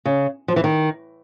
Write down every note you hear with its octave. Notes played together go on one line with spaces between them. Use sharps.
C#3
F3
E3
D#3